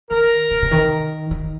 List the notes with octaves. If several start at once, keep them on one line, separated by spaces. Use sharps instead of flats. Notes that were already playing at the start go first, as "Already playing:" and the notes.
D#3 A#4
C3
C3
D#3
D#3